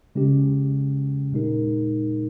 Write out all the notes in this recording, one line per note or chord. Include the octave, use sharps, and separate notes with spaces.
C#3 G#3 C#4 G4
A#2 G#3 D#4 A#4